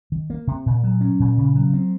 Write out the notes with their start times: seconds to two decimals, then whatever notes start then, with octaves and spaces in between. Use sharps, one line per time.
0.12 D#3
0.30 A#3
0.47 C3
0.66 A#2
0.84 F#3
1.01 C#4
1.20 A#2
1.37 C#3
1.55 F#3
1.74 C4